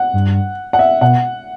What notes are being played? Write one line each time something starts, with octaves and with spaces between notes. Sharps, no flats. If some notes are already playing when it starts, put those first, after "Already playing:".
Already playing: F#5
G2
F#5
E5
B2 F#5